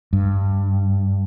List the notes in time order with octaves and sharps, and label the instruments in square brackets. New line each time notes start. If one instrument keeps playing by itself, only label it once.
[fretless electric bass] G2